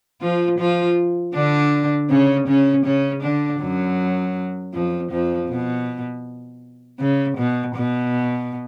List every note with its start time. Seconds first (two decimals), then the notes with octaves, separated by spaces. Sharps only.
0.21 F3 F4
0.59 F3 F4
1.35 D3 D4
2.10 C#3 C#4
2.47 C#3 C#4
2.85 C#3 C#4
3.22 D3 D4
3.61 F#2 F#3
4.74 F2 F3
5.11 F2 F3
5.49 B2
7.00 C#3
7.37 B2
7.75 B2